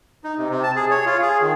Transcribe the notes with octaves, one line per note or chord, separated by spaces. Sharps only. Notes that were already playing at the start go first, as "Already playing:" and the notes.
D#4
C3
C3
A5
G#4
C#5
F4
G#4
D#3